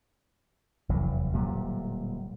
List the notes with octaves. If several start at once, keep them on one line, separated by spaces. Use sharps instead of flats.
F1 E2 F#3
D1 A#2 F#3 G3